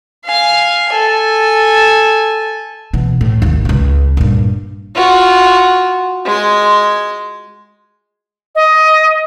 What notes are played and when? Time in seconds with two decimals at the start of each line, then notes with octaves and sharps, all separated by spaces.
0.25 F5 G#5
0.89 A4 G#5
2.93 B2 E3
3.21 A2
3.42 G#1 D#2
3.65 C#2 C#3
4.17 G2 A#2
4.95 F4 F#4
6.25 G#3 C6
8.55 D#5